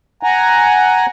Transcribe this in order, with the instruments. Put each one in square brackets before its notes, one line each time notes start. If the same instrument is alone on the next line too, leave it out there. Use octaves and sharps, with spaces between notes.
[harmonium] F#5 G#5 A#5